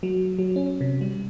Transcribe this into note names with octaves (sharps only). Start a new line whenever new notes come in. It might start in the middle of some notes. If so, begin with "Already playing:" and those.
F#3
F#3
C#4
C3
G3